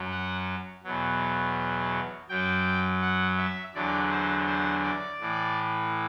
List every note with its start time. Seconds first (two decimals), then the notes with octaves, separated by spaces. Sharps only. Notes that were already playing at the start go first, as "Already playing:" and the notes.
Already playing: F#2 F#3
0.11 F#5
0.84 E2 B2 F#3
2.29 F#2 F#3 G5
3.02 F#5
3.38 E5
3.74 E2 D3 F#3 D5
4.11 C5
4.47 C5
4.83 D5
5.20 A2 E3